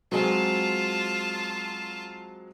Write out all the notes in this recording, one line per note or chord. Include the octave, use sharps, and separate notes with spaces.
F#3 G#3 C4 F4 A5